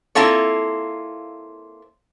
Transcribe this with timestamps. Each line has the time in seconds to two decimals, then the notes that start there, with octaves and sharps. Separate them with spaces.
0.15 A#3 C4 E4 F4 A4 C#5